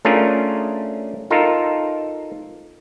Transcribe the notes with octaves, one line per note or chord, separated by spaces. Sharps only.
A3 C#4 D4 F4 G#4 A#4
D#4 F4 A4 A#4